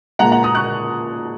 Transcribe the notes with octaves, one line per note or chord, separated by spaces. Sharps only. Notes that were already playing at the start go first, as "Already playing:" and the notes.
A#2 G#3 F#5 A#5
F#5 A#5
A#5 D#6
C#6 F#6